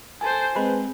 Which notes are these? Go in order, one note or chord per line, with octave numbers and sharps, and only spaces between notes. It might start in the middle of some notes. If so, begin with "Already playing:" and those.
A4 C5 G#5 A5
G#3 C4 B4 C5